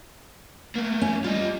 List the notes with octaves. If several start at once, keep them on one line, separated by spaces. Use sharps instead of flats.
A3 A#3
C#4
G3 F4 D#5